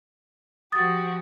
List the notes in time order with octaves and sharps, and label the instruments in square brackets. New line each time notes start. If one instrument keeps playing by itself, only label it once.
[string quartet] F3 F#4 G4 [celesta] D#6 A6